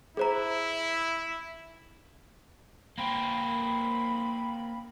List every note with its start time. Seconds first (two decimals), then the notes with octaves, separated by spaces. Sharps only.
0.17 E4 G#4 C5 A#5
2.98 A#3 C4 B5